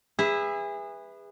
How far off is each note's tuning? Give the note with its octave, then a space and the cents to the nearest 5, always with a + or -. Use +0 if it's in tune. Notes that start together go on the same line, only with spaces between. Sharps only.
G#4 -30 B4 +0 E5 +0